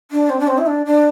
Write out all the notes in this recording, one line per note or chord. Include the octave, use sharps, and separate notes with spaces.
D4
C4
D4
C4
E4
D4
D4